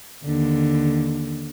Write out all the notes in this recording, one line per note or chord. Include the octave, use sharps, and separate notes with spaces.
D#2 D3